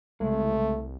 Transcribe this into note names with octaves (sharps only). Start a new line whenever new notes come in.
C2 C#3 G#3 A3